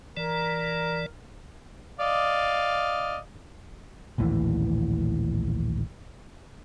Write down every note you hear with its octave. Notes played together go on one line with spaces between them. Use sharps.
E3 A#4 D5
D5 D#5 F5
A#1 D#2 A2 E3